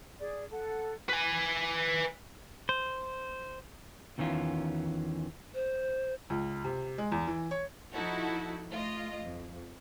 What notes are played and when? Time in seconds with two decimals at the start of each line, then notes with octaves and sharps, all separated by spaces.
0.20 G#4 D5
0.51 A4 F#5
1.09 B4 G#5
2.69 C5
4.18 E2 D#3 E3 C#4 F4
5.54 C5
6.30 C#2
6.64 C3
6.98 G#3
7.12 E2
7.27 E3
7.51 C#5
7.92 F3 D#4 E4 F#4 A4
8.70 A3 F4 D#5
9.23 F2